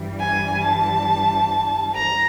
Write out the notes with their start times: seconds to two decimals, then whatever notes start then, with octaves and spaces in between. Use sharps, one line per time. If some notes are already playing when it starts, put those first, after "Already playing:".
Already playing: G2 E3 G3
0.20 G#5
0.63 A5
1.96 A#5